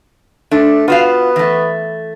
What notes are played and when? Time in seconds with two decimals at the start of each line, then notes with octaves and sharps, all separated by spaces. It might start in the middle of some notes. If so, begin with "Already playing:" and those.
0.51 A3 D4
0.88 B3 F4 F#4 F5
1.36 E3 A3